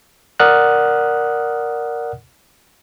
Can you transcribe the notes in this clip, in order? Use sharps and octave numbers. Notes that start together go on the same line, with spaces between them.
A#4 D5 F#5 D#6 F6 F#6